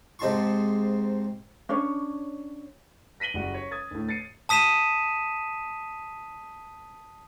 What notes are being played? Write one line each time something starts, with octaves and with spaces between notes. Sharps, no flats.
G#2 C3 D#4 A5 C6 C#6
C#4 D4 C#5
A#6 B6 D#7 F#7 G7
F#1 G3 F#4 D#7
C#5
D#6 G#6 A6
D2 A2
A6 C7 C#7 D#7
A5 D#6 B6 D#7 E7